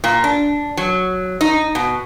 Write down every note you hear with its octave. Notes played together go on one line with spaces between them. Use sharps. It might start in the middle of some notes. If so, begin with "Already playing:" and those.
A#2
D4
F#3
D#4
B2